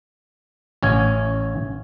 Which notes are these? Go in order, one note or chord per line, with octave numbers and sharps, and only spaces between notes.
A1 C#4 G#5